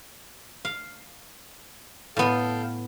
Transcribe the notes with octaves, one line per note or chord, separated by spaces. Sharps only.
F5
A2 B3 A4 F5 G5